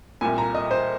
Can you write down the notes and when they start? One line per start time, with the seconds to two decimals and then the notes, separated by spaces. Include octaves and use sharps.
0.21 C2 A#2 G#5
0.38 A#5
0.54 D#5
0.71 C5